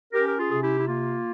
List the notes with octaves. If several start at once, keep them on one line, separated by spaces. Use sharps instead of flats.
C#4 G4 A#4
A#4
F4 G#4
C3 G#4
E4 G4
E4
A#3 F4